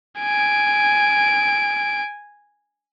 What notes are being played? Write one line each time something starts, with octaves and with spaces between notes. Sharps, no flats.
G#5 D7